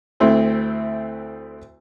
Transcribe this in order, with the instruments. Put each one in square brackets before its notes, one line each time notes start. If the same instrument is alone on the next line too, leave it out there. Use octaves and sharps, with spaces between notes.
[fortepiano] D2 A3 C4 E4 C5